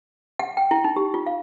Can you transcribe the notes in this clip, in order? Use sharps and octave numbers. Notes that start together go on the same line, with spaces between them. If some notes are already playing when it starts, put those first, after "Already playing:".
F#5
G5
E4
D#4
G4
F4
F5